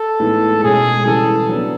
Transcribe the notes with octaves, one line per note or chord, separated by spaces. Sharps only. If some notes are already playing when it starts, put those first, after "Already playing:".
Already playing: A4
A2 E3 G#3 B3 D#4
B2 G#3 C#4 G#4
C#3 E3 G3 A4
F#3 B3 D4